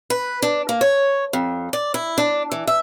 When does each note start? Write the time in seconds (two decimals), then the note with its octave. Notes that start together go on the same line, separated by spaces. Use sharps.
0.10 B4
0.42 D4
0.69 A#3
0.81 C#5
1.33 F2
1.73 D5
1.94 E4
2.18 D4
2.52 E3
2.67 E5